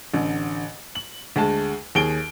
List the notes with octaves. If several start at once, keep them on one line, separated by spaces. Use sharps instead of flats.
A1 D3
F#7
D2 G#3 A5
D#2 G#4 D7 G7